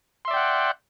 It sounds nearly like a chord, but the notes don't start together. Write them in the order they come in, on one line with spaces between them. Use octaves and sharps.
C6 E5 D5 G5 F#5